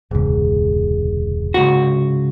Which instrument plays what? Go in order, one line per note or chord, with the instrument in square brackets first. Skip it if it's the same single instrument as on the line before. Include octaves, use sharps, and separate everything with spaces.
[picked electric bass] E1 C#2 [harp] G#2 C3
[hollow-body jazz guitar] C#2 F#4